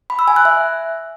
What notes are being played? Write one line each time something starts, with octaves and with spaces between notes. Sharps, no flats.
B5
E6
G#5
F#6
E5